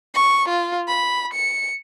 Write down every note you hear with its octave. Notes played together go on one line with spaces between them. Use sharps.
C#6
F4
B5
C#7